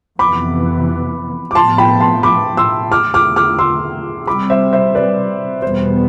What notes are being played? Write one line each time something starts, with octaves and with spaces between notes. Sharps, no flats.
F2 C3 E3 B3 B5 D6
D6
A2 F3 B3 A5 C6
G5 B5
A5 C6
B5 D6
C6 E6
E2 D3 A3 D6 F6
D6 F6
D6 F6
C6 E6
C3 G3 C4 B5 D6
C5 E5
C5 E5
B4 D5
E2 B2 G3 B3 C5